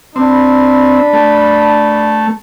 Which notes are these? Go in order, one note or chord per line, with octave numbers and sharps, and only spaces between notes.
C4 D4 B5
A3